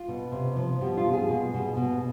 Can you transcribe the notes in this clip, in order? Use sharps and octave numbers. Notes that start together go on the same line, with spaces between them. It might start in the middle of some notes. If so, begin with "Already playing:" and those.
Already playing: F4
B2
C3
F3
B2 G4
F4
B2
G#4
B2
B2
B2